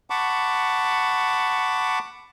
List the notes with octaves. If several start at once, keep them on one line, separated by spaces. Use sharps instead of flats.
F#5 A5 B5 C#6 D6